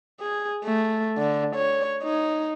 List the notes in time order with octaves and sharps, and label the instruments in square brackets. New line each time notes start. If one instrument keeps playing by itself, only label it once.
[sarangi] G#4
A3
D3
C#5
D#4